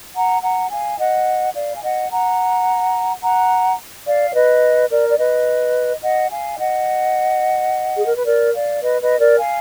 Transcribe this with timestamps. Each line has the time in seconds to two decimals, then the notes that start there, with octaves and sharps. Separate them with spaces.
0.15 F#5 A#5
0.42 F#5 A#5
0.71 F5 G#5
0.98 D#5 F#5
1.55 D5 F5
1.75 G#5
1.83 D#5 F#5
2.11 F#5 A#5
3.22 F#5 A#5
4.07 D5 F5
4.30 D5
4.34 B4 D#5
4.91 A#4 D5
5.08 D5
5.18 B4 D#5
6.02 D#5 F#5
6.30 F5 G#5
6.59 D#5 F#5
7.96 G#4
8.05 A#4
8.17 B4
8.26 A#4 D5
8.54 D5 F5
8.82 B4 D#5
9.01 B4 D#5
9.19 A#4 D5
9.38 F5 G#5